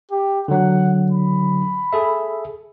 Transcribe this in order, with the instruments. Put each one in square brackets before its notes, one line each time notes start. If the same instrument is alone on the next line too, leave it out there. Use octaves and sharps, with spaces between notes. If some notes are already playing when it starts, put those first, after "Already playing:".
[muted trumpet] G4
[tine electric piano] D3 F#3 [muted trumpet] F#5
[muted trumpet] B5
[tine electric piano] G#4 A4 E5